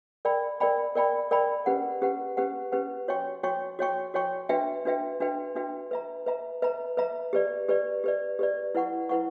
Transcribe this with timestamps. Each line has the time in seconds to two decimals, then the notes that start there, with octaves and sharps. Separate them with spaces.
0.25 A#4 D5 G5 B5
0.60 A#4 D5 G5 B5
0.95 A#4 D5 G5 B5
1.31 A#4 D5 G5 B5
1.66 C#4 G4 B4 F#5
2.01 C#4 G4 B4 F#5
2.37 C#4 G4 B4 F#5
2.72 C#4 G4 B4 F#5
3.08 F#4 C#5 G5 C#6
3.43 F#4 C#5 G5 C#6
3.79 F#4 C#5 G5 C#6
4.14 F#4 C#5 G5 C#6
4.49 D4 F#4 B4 E5 G5
4.85 D4 F#4 B4 E5 G5
5.20 D4 F#4 B4 E5 G5
5.55 D4 F#4 B4 E5 G5
5.91 B4 E5 A#5
6.26 B4 E5 A#5
6.62 B4 E5 A#5
6.97 B4 E5 A#5
7.33 G4 B4 D5
7.69 G4 B4 D5
8.04 G4 B4 D5
8.39 G4 B4 D5
8.75 E4 B4 F#5 C#6
9.09 E4 B4 F#5 C#6